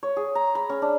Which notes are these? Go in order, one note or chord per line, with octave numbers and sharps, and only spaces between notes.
C#5
G#4
A#5
B5
C#4
D4